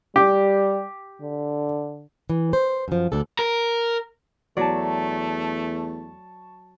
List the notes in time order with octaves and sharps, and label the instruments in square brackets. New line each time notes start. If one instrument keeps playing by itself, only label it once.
[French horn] G3 [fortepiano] G4
[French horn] D3
[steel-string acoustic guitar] E3
C5
F#2 F3
D2 D4 A4
[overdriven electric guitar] A#4
[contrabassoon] E2 [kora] F#3 D5 [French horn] A3 [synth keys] A5 C#6